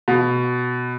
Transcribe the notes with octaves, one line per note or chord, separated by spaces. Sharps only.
B2